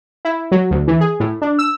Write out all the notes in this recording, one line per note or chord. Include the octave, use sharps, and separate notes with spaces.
E4
F#3
D2
E3
G#4
A2
D4
E6